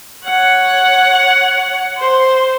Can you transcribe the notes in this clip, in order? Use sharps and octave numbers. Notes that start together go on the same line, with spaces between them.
C#5 F#5
C5